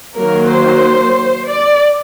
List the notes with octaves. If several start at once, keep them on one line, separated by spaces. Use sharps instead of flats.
D#3 F#3 A#3 A#4
C5
D5